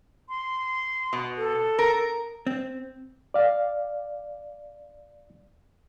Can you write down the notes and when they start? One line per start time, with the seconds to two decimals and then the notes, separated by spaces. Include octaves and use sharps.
0.29 C6
1.13 B2
1.37 A4
1.79 A#4
2.47 C4
3.34 D5 F5